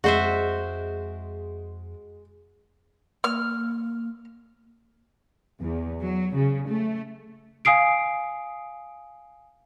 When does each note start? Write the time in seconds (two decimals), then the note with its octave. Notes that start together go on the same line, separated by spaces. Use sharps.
0.04 F2 G#3 F#4 C5 E5
3.24 A#3 F6
5.61 E2
6.01 F#3
6.35 C#3
6.67 A3
7.65 F5 G#5 D#6 C7 D7